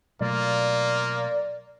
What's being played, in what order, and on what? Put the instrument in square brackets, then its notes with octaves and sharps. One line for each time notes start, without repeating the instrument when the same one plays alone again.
[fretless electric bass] B2 F#3 A3 [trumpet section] A#3 F4 [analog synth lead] D5